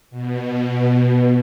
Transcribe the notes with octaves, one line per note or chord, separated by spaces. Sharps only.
B2